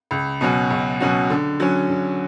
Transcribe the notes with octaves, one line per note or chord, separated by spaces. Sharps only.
C#2
B2 F#3 C#4 F#4
C#2
B2 F#3 C#4 F#4
D3
F#3 C#4
D3